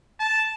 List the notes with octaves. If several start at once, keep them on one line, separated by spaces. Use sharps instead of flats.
A5